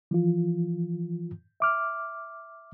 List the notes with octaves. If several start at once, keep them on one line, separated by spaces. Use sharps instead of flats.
E3 F3 F4
E5 D6 F6